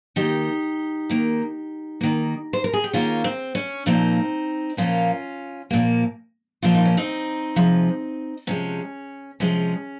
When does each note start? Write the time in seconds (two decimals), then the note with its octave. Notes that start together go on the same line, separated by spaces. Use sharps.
0.16 D#3 A#3 D#4 G4
1.10 D#3 A#3
2.01 D#3 A#3
2.53 C5
2.64 A#4
2.73 G#4
2.84 G4
2.93 D#3 A#3 C#4 F4
3.24 C4
3.55 C#4
3.86 A#2 F3 A#3 C4 D#4
4.77 A#2 F3 A#3 C#4 F4
5.71 A#2 F3 A#3
6.62 A#2 F3 A#3 F4
6.75 D#4
6.85 C#4
6.97 C4 D#4
7.56 C3 F3 G#3
8.47 C3 F3 G#3 C#4
9.40 C3 F3 G#3 C#4